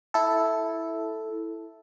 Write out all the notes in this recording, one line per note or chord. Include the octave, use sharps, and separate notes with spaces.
E4 A4